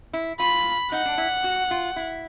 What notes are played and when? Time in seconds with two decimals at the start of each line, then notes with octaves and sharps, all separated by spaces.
0.13 E4
0.40 F4 B5
0.92 D#4 F#5
1.05 D4
1.18 E4
1.44 F#4
1.71 F4
1.96 E4